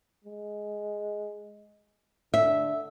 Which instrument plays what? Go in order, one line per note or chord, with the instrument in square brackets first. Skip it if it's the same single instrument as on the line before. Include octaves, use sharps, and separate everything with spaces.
[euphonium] G#3
[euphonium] D3 [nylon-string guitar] E5